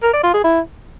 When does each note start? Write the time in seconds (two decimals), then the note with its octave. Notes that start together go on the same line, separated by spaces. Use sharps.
0.03 A#4
0.13 D5
0.23 F4
0.34 G#4
0.44 E4